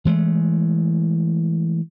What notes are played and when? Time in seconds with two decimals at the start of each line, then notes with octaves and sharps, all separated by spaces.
0.05 E3 G#3 A3